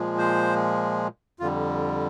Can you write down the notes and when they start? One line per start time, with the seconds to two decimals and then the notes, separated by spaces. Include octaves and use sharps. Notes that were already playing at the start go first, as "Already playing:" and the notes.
Already playing: A#2 F3 G#3
0.18 C5
1.40 F2 D3 G3 F4